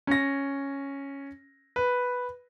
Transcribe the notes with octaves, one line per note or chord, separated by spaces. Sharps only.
C#4 A#6
B4